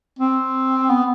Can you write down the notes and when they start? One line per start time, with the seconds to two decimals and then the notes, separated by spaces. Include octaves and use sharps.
0.19 C4
0.90 B3